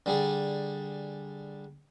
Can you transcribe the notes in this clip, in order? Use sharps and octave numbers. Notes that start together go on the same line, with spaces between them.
D3 G3 G#4